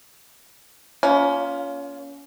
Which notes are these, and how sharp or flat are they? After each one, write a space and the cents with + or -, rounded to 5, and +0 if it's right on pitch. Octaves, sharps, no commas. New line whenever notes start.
A#3 +25 C#4 +30 F4 +0